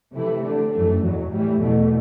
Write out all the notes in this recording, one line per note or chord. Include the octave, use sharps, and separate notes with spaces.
C3 E3 A3 E4
D3 A3 D4
F#2 E3 A3
E2 B2 F#3
A2 E3 G3
E2 B2 A3